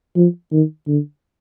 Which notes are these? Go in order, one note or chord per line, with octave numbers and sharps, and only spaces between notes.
F3
D#3
D3